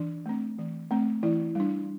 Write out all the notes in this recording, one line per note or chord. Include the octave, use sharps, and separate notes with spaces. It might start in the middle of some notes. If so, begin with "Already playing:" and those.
Already playing: E3 D4
A3 C4
E3
A3 C4
E3 E4
G3 D4